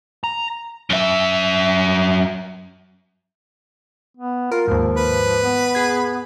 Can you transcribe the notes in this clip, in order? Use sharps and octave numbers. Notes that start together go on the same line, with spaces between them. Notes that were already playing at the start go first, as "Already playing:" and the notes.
A#5
F#2 E5
B3
F4 A#4
D#2 G#2 F3
B4
B3
G#4 G#6